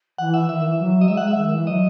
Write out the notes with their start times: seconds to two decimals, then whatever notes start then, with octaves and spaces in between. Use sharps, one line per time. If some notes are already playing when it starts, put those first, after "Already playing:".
0.18 E3 F#5
0.34 E5
0.48 D#3 E5
0.64 E3
0.78 F#3
1.01 D#5
1.07 G#3 E5
1.17 F#5
1.23 G#3 E5
1.36 D#3
1.51 E3
1.66 F#3 D#5